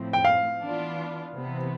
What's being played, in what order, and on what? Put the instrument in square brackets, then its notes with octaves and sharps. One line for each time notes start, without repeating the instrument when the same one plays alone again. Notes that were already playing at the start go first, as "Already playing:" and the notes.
Already playing: [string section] A2 F3 C4
[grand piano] G5
F5
[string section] E3 B3 D4 F4
C3 E3 B3